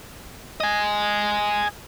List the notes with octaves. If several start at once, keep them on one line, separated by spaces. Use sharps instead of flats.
D#5 G#5